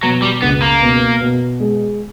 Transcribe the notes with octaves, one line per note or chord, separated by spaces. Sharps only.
B2 F#3
G3
C#2 B3
A#3
B2
B2
G#3